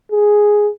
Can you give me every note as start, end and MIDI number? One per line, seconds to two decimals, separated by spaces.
0.12 0.69 68